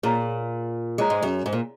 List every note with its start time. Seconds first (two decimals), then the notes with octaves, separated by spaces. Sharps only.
0.03 A#2 G#4 C#5 A#5
0.98 G#3 G#4 C#5 A#5
1.10 G#2
1.23 F#2
1.46 G#2
1.53 A#2